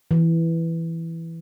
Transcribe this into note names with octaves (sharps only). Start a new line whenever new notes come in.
E3